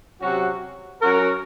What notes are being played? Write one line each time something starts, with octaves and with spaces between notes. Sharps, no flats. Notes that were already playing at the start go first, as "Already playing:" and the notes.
C3 F#3 C#4 F#4
F#3 C#4 F#4 A#4